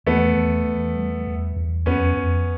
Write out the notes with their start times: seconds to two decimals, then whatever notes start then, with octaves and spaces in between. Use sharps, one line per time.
0.07 E2 A3 B3
0.37 E2
0.67 E2
0.97 G3
1.27 E2
1.56 E2
1.86 F2 B3 C#4
2.17 F2